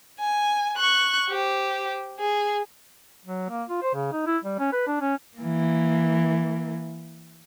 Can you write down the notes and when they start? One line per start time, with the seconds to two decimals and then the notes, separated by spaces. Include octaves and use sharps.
0.20 G#5
0.77 C#6 F#6
1.30 G4 C5
2.20 G#4
3.25 F#3
3.49 A#3
3.69 F4
3.82 C5
3.94 C#3
4.12 D#4
4.27 E4
4.44 G3
4.59 C#4
4.72 B4
4.87 D4
5.01 C#4
5.37 E3 A#3